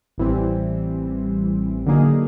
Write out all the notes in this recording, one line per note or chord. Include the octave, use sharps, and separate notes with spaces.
A1 A2 E3 G3 C4
D3 F#3 A#3 D#4 G#4